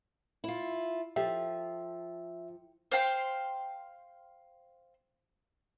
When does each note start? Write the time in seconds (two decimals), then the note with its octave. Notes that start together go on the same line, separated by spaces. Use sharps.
0.44 E4 F4
1.16 F3 F4 G4 A4 E5
2.92 C5 F5 G5 C6